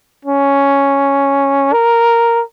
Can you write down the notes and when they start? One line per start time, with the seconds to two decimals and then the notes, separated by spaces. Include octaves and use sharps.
0.25 C#4
1.73 A#4